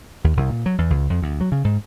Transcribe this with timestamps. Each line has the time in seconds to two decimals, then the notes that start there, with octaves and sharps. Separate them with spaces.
0.24 D#2
0.37 C2
0.50 A#2
0.66 F#3
0.78 E2
0.90 C#2
1.10 F2
1.22 D2
1.41 F#3
1.52 C#3
1.64 G#2